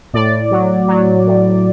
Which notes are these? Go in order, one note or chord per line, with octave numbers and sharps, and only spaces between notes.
A2 D5
F#3
F#3
A2